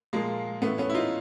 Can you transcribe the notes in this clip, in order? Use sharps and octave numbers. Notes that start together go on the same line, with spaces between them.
A#2 F3 G#3 A#3
A2 E3 A3 B3
B3 C#4
E4
D#4 F4